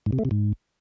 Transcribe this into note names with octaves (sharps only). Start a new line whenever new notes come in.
G#2
C3
A3
C3
G#2